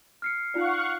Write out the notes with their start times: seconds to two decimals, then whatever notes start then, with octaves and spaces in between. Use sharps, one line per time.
0.22 F6 C7 C#7
0.54 D#4 F4 D5 F5 F#5 C#6